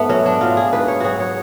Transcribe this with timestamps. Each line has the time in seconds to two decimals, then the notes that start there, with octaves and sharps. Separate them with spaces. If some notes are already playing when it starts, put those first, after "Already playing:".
Already playing: G#2 A3 B3
0.09 F#3 C#4
0.26 D4
0.41 F#3 F4
0.57 G#4
0.73 G#2 B4
0.88 C#5
1.00 F#3 F#4 G#4
1.20 C#5